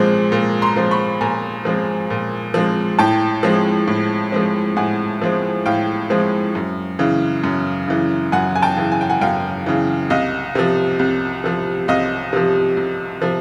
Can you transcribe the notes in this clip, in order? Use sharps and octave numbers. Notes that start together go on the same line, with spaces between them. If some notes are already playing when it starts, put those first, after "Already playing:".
Already playing: A#2 F3 G#3 C4
A#2
A#5 C6
F3 G#3 C4
B5 C#6
A#2 G#5 A#5
F3 G#3 C4
A#2
F3 G#3 C4
A2 G5 A5
F3 G#3 C4
A2
F3 G#3 C4
A2 F#5 G#5
F3 G#3 C4
A2 F5 G5
F3 G#3 C4
F#2
C#3 E3
F#2
C#3 E3
F#2 F#5 G#5
G#5
G5 A5
C#3 E3
G#5
G5
F#5 G#5
F#2 F5 G5
C#3 E3
C2 D#5 F5
C3 F3
C2
C3 F3
C2 D#5 F5
C3 F3
C2
C3 F3